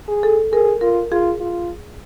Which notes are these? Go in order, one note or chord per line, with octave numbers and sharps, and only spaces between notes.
G#4
A4
G#4 A#4
F4 A#4
F4 G#4
F4